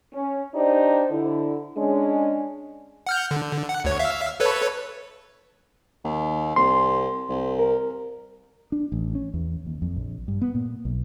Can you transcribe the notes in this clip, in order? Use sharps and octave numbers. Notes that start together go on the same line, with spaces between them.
C#4
D4 D#4 G4 C5 D5
D3 E4
G#3 C#4 D4
F#5 F6 G6
D3
F#5
D2 C#5
E5 F5
A4 B4 C#5
D#2
C2 C6
C2
A#4
D4
A1
C#4
E2
D#2
F2
A#1
G2
B3
A#2
B1